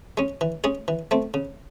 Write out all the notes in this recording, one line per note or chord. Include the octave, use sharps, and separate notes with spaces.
G#3 C#4
E3
G#3 C#4 G#4
E3
A3 C4
C#3